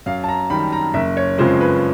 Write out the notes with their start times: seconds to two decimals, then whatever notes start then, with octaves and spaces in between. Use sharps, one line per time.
0.06 F#2 F5
0.24 A5
0.29 A#5
0.50 D#3 G3 B5
0.73 A#5
0.94 F#1 E5
1.17 C#5
1.38 F2 C#3 F3 G#3 C5
1.61 B4